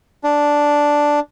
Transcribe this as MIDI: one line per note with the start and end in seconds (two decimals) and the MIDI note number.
0.24 1.20 62